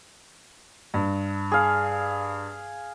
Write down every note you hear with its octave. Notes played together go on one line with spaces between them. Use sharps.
G2
G#4 F5